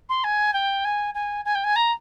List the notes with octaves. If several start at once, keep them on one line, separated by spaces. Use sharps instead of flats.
C6
G#5
G5
G#5
G#5
G#5
G5
G#5
A#5